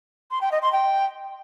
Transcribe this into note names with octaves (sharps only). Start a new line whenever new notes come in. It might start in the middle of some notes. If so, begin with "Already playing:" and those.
C6
G5
D#5
C6
G5